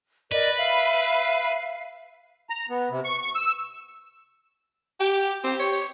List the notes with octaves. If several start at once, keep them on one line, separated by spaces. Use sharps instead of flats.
A#4 B4 D5 D#5
E5 F5
A#5
B3
C3
C#6
C#6
E6
G4 G5
C4 G4
C#5
C#5